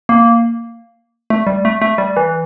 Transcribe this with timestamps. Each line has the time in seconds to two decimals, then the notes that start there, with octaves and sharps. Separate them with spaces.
0.09 A#3
1.30 A3
1.47 G3
1.65 A3
1.82 A3
1.98 G3
2.17 E3